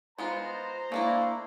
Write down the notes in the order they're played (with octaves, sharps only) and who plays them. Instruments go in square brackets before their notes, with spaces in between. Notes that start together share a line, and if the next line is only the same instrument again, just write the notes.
[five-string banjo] G#3 B3 F4 [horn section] C5 A#5
[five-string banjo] A3 D4 E4 [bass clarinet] A#3